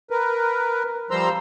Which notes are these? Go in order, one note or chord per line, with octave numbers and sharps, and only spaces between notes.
A#4 B4
F3 G3 C5 A#5 C6 E6